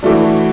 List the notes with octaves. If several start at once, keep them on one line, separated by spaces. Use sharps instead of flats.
E3 A3 D4 F#4